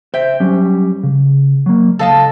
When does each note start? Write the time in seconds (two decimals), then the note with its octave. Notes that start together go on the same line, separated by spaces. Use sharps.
0.14 C5 E5 G5
0.40 F#3 G3 C#4
1.03 C#3
1.66 F#3 A#3
1.99 C#2 A4 D#5 F5 A5